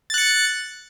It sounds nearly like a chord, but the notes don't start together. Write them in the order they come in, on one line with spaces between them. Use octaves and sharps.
A6 F#6 C#7